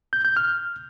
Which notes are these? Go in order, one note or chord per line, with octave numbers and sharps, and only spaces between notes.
G6
G6
F6